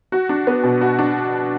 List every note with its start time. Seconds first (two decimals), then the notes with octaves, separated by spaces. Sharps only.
0.12 F#4
0.29 D4
0.47 B3
0.64 B2
0.81 F#4
0.99 D4